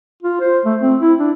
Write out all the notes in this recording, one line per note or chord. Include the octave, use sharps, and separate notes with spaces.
F4
C5
A3
C4
E4
D4